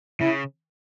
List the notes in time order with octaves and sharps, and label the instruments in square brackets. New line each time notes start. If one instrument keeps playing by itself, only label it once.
[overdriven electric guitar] C#3 [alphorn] E4